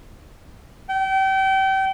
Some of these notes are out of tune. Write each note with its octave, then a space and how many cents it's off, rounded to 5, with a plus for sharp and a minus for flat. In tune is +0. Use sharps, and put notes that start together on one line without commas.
G5 -30